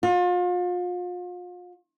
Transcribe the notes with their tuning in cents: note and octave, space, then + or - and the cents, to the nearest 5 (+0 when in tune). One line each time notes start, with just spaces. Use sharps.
F4 +35